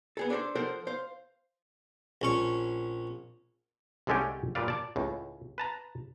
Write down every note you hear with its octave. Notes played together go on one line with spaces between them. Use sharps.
B3 G#4 A4
D4 A4 A#4 C5
F3 A4 A#4 C5 F#5
C5 F5
A#1 C#4 C#6
C2 D3 G#3 A3 C#4 G4
A#2 G3 B4 D5 F5
D5 A5
C#2 A2
B4 A5 A#5